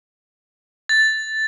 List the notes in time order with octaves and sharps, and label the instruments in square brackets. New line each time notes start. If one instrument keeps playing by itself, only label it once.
[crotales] A6